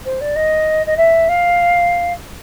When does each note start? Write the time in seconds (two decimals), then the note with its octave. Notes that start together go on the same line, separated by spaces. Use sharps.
0.05 C5
0.20 D5
0.36 D#5
0.86 D#5
0.97 E5
1.28 F5